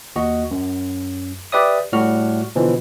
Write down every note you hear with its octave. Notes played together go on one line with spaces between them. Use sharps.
D#2 F#4 D#5
F#2
G4 B4 D5 E5 D#6
A2 G3 F#4 F6
B2 D3 E3 F3